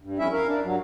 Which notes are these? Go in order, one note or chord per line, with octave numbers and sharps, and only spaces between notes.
G2
F2 C#4 E4 E5
A#4 F5
D4
G2 F#3